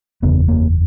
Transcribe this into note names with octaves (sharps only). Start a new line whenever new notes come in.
F#1 E2 C#3 B3
A#3